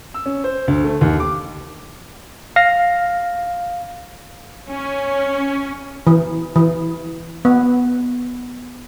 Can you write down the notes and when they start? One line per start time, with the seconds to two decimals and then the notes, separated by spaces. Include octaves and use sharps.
0.14 E6
0.26 C#4
0.44 C5
0.68 D2
0.84 A3
1.01 D#2
1.20 D6
2.56 F5 A#6
4.67 C#4
6.07 E3
6.56 E3
7.45 B3